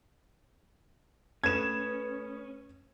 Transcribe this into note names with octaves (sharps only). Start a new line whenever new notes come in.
A3 C#4 B4 D#6 G#6 E7